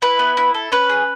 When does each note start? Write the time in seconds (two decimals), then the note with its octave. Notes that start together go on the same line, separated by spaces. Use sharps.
0.02 E4 B4
0.19 B3
0.37 E4
0.54 A4
0.72 C#4 B4
0.89 G#4